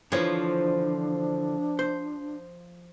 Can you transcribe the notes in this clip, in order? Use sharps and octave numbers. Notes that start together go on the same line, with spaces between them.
D3 E3 F3 D4 C#5
C5